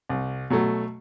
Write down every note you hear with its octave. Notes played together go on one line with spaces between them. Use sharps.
C2
B2 F#3 A3